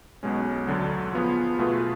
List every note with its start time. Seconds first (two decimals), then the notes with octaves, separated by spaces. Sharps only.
0.23 B1 B2 G#3 C#4
0.67 D2 D3 F#3
1.13 F3 B3 F4 G#4
1.58 B2 A3 F4 G#4 B4